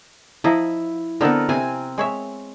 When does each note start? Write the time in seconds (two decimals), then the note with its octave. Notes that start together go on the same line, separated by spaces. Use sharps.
0.44 F3 E4 D#5 A#5
1.21 D3 B3 C4 A4 A#4 D#5
1.49 C3 C4 G#5
1.98 G#3 C#5 E5